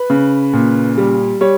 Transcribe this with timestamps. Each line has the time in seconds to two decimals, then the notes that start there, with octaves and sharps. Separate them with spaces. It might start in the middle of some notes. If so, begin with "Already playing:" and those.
Already playing: B4
0.10 C#3
0.53 A#2
0.98 G3
1.41 G3 C#5